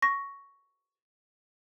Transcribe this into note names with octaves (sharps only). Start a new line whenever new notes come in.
C#6 A#6